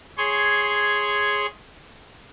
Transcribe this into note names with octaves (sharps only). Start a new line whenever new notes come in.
G#4 C#5 C6